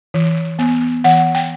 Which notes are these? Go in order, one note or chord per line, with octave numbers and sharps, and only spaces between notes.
E3
B3
E3 F#5
G5